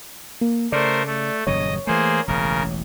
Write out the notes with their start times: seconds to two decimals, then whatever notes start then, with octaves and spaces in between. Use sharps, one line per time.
0.41 A#3
0.72 C#3 A3 A#4 C5 D5
1.06 A3
1.47 D#1 F#2 C#3 C#5 D#5
1.87 E3 A3 A#3 G#4 C5
2.28 E1 A1 C#3 A#4